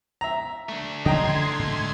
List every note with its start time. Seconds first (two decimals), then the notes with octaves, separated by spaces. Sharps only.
0.21 E5 A#5
0.69 A3 D4
1.05 C#3 E3 F3 D#5 G5 A#5 C6 G#6
1.59 G#2 D3